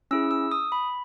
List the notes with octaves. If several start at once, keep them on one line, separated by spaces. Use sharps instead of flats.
C#4 E4 G#4 E6
E6
D#6
B5